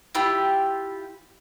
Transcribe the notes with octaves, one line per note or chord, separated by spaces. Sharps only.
E4 F4 G4 B5